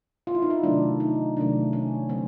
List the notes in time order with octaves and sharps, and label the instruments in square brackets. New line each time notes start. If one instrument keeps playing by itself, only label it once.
[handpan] F4
E4
D#4
E4
C3 D#3 F#3 A3 D4
D#4
C3 D#3 F#3 A3 D4
C#4
D3 F#3 A3 C4